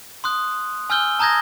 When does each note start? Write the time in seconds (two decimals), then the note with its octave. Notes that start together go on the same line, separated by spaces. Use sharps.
0.24 C6 D#6 F#6
0.90 G#5 E6 F6 G6 G7
1.19 A5 A#5 D#6 G6 G#6 A#6